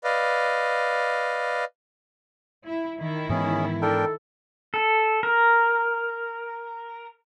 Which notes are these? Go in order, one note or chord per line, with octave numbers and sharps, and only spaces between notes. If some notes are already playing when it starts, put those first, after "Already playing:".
B4 D5 D#5 F5
E4
D#3 E4
G#2 E3 B3 C#4 G#4
D4 A4 A#4 G5
A4
A#4